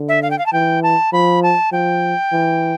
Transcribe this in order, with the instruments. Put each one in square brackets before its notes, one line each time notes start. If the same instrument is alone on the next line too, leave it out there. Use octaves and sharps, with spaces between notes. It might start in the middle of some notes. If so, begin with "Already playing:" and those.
Already playing: [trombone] D3
[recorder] E5
F5
G5
F5
A5
[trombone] E3 [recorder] G5
[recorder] A5
[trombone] F3 [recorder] B5
[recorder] A5
[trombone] F3 [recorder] G5
[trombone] E3